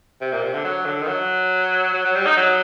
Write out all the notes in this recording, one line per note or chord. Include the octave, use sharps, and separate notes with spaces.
C3
A#2
C3
D3
F#3
D3
D#3
F#3
F#3
F#3
G3
D#4
F#3